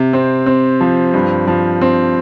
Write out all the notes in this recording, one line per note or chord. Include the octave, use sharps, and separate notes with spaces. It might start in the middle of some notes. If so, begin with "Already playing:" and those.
Already playing: C3
C4
C4
F3
G2
F3
C4